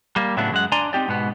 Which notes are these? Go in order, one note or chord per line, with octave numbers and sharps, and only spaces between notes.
G3 A#3
A2 C#3 F#3 A3 B3 D4
F#2 G#3 F#5
D4 D5 G#5 A#5 C6
C4 D#4 G4 D5
G#2 B2 B3